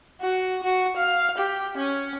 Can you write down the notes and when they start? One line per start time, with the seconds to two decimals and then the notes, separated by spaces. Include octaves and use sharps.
0.21 F#4
0.63 F#4
0.96 F5
1.38 G4
1.77 C#4